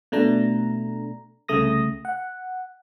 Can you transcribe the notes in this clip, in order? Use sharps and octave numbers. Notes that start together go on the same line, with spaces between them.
B2 A3 D4 A#5
C2 C#3 A3 D#6 A#6
F#5